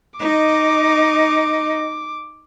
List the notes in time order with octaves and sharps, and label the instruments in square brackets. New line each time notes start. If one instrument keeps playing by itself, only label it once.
[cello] D#4 D#5 [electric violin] D6